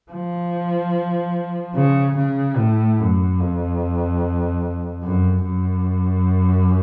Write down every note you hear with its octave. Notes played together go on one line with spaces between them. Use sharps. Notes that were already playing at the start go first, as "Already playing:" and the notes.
F3
C#3
C#3
A2
F#2
F2
F#2
F#2